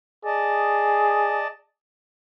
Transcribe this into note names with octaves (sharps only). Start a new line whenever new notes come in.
G#4 D5 D#5 A5